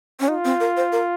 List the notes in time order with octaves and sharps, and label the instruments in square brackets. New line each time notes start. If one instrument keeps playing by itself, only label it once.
[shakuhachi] C#4
[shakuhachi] D#4 [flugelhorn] F4
[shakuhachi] C4
A#4
C5
A#4